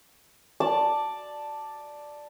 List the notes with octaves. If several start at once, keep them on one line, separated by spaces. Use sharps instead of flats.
D5 A5